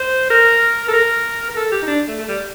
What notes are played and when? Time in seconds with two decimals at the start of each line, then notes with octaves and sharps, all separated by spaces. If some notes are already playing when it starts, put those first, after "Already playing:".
Already playing: C5
0.30 A#4
0.88 A4
0.93 A#4
1.50 A#4
1.56 A4
1.71 G4
1.82 D#4
1.87 D4
2.08 A3
2.19 A3
2.28 G3